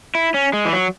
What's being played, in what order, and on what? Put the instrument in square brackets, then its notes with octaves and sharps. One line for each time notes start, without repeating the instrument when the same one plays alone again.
[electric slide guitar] E4
C#4
G#3
E3
F#3